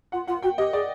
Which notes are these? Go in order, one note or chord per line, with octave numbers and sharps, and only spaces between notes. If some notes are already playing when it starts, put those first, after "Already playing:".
F4 F#5
F4 F#5
F#4 G5
G4 D#5
G#4 D5